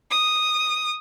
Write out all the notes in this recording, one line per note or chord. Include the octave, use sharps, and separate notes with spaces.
D#6